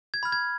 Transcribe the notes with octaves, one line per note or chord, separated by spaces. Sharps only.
G#6
B5 F6
G#6